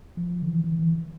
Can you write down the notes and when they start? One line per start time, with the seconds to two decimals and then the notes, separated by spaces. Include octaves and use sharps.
0.17 F3
0.42 D3
0.49 E3
0.64 E3
0.79 E3